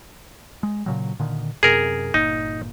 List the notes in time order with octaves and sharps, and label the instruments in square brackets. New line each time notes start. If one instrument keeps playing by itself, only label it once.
[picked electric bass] G#3
A#2 C#3 F#3
A#2 D3 D#3
[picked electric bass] F#2 C3 [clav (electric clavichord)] G#4 A#4
[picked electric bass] G1 A#2 [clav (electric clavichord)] D#4